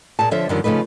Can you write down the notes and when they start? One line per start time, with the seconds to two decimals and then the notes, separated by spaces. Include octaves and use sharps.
0.19 A#2 G#4 A5
0.31 D3 F3 C#5 E5
0.49 F#2 D3 D#3 F3 G3
0.64 C#3 F3 A3 D#4 B4